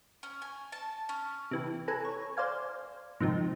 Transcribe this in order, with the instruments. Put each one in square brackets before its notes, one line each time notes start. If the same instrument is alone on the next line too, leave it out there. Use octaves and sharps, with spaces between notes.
[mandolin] C#4
G#5
A5
C#4
[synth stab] C3 E3
A4 B4 G#5 A#5
C#5
C5 D5 F5 G#5
G#2 C3 D#3 F3